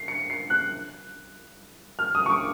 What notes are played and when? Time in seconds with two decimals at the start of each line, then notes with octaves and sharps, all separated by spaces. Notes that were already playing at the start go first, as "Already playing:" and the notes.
Already playing: C7
0.08 C#7
0.30 C7
0.50 F#6
1.99 F6
2.15 D#6
2.26 C#6
2.31 D6